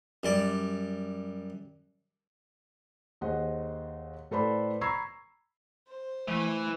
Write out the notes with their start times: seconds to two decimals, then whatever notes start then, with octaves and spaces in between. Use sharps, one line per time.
0.23 F#2 G3 D5
3.21 D#2 G#4 C5 D#5 F#5
4.31 A2 A4 B4 C5 D5 B5
4.81 A#5 B5 C#6 E6 G#6 C7
5.88 C5
6.28 E3 A3